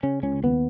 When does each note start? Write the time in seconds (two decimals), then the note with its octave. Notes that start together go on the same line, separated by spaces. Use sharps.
0.03 C#3 C#4
0.23 C#2 C#4
0.43 D#2 B3